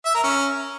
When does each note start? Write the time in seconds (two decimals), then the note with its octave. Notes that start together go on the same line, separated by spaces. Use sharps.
0.05 E5
0.14 A#4
0.24 C#4